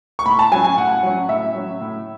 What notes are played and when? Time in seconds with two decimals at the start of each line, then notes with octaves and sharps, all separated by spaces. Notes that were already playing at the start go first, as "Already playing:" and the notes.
0.19 C#6
0.26 A2 B5
0.39 A5
0.52 F#3 C#4 G#5
0.64 G#5
0.77 A2 F#5
1.03 F#3 C#4
1.29 A2 E5
1.55 F#3 C#4
1.81 A2